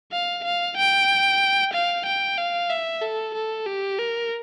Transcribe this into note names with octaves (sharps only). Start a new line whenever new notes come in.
F5
F5
G5
F5
G5
F5
E5
A4
A4
G4
A#4